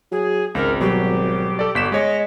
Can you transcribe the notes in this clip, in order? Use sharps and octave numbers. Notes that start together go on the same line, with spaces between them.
F#3 G#4
G#1 C#2 A#4
B2 F#3 G3 G4
A4 D5
G1 B6 E7
G#3 C#5 D#5